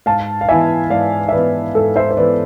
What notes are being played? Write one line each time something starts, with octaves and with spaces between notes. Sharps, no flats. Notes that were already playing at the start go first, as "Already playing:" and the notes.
G#2 F5 A5
F5
E3 B3 E4 E5 G#5
G#2 D5 F5
E5
E3 B3 E4 B4 D5
G#2 A4
C5 E5
C5
E3 B3 E4 B4 D5